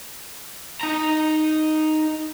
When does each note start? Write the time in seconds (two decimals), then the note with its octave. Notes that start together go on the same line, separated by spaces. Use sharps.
0.81 D#4 A#5